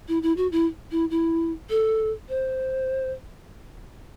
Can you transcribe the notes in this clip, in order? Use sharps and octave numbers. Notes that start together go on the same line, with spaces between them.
E4
E4
F#4
E4
E4
E4
A4
C5